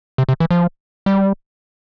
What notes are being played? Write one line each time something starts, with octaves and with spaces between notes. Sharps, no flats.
C3
C3
E3
F3
G3